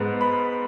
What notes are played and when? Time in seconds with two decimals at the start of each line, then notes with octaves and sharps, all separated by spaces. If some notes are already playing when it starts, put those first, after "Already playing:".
Already playing: G#2 G#3 B3
0.21 B5